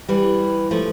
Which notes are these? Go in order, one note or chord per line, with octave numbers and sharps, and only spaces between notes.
E3 G3
F3 A3